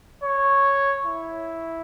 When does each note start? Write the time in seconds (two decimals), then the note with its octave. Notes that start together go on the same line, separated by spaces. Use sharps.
0.23 C#5
1.06 E4